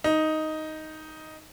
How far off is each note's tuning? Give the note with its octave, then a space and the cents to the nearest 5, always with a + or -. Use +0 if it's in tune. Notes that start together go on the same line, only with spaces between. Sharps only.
D#4 +5